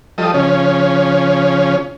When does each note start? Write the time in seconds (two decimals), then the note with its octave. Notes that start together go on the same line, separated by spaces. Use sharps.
0.18 F3 G3 A4 D#5
0.34 C#3 F3 C#4